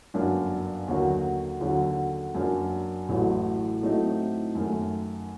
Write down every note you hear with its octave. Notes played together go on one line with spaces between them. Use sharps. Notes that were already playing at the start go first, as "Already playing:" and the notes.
G1 F#2 F#3 A#3 D4
D#2 D3 F#3 A#3
D#2 D3 F#3
F#2 F#3 A#3 D4
A1 A2 F#3 A3
A2 F#3 A3 C4 D#4
F#2 D#3 A3